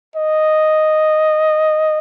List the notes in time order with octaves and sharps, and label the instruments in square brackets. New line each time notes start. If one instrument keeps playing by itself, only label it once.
[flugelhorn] D#5